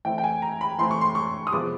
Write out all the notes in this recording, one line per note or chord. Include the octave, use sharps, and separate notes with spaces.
E3 A3 C4 G5
G5
G#5
A#5
B5
E3 A3 C4 C6
C#6
C6
C#6
D#6
C3 F3 G#3 B3 D6